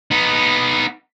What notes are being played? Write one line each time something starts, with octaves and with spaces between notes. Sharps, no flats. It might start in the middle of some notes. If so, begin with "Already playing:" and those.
B3 D#4